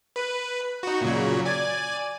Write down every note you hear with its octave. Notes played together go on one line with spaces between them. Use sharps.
B4
D#4 F#4
A#2 C#3 F#3
D5 G#5